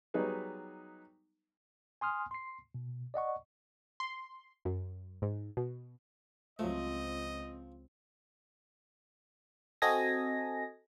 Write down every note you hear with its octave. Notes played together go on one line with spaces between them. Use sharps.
F#3 G3 B3 D#4 G#4 B4
G#5 C6 D#6 F6
C6 C7
B2
D5 D#5 F#5 C#6
C6
F#2
G#2
B2
C#2 F3 F#3 A3 C4 D#5
C4 F#4 A4 D#5 G#5 A#6